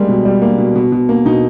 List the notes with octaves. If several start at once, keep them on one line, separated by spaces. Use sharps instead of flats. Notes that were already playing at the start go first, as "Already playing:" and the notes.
Already playing: G3 G#3 A#3
B2
G3
A#3
B2
B2
B2
A#3
B2 D#4